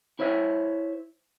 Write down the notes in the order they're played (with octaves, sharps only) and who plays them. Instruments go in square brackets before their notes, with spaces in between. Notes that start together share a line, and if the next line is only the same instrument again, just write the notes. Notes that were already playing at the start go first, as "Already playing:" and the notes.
[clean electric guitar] E4 C5 C#5 E5